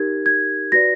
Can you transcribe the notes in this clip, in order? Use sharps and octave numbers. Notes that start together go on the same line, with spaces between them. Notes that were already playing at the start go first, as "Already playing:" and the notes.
Already playing: D#4 G4 A#4 G#6
G#6
F#4 B4 D5 A#6